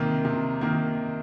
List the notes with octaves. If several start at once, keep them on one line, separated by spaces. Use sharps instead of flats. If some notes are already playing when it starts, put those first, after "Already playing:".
Already playing: C3 D#3 A#3
C3
D#3 A#3